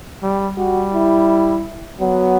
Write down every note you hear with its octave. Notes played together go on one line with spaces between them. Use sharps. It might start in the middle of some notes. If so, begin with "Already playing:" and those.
G3
G3 F#4
E4
F#3 B3